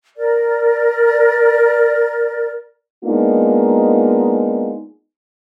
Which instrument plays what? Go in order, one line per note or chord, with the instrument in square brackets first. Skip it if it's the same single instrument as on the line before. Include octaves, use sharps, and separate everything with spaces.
[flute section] A#4 D5
[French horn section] G#3 A#3 B3 D4 D#4 F4